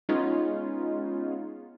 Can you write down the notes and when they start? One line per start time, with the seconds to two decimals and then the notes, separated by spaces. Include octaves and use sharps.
0.09 G#3 B3 C#4 D#4 F4